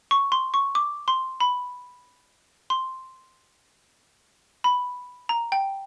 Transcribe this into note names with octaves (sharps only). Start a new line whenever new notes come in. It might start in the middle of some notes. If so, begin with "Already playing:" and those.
C#6
C6
C#6
D6
C6
B5
C6
B5
A#5
G5